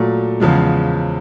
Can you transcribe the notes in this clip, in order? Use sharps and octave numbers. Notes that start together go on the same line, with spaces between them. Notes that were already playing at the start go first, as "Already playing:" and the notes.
Already playing: A#2 F#3 A3
E2 C#3 F3 G#3